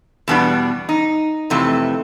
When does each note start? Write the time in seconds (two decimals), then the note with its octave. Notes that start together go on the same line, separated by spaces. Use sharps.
0.28 E2 B2 G3 B3 D4
0.89 D#4
1.50 F2 C3 E3 A3